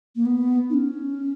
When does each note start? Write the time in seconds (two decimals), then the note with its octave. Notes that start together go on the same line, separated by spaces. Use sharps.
0.16 A#3
0.26 B3
0.70 D#4
0.74 C#4